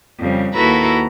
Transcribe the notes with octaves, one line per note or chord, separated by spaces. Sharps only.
F2 C#3 G3
D#2 E4 F#4 A4 B4 A#5